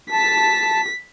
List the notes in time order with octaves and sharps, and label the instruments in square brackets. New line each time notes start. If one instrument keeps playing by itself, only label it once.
[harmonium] A5 [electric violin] B6